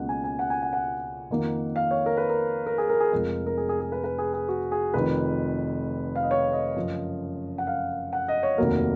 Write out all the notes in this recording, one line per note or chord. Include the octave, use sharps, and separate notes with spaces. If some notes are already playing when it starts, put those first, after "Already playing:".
Already playing: C#2 B2 A#3 C#4 F#5
G#5
G#5
F#5
G#5
F#5
F#5
F2 D#3 A#3
F5
C#5
A#4
B4
A#4
A#4
G#4
A#4
G#4
F1 F2 F3 G#3 A#4
A#4
G#4
G#4
G#4
B4
B4
G#4
G#4
F#4
G#4
F1 F2 D#3 B4
F5
D#5
C#5
D#5
F#2 C#3 F3
F#5
F5
F#5
D#5
C#5
F1 D#2 D#3 F#3 A#3 A#4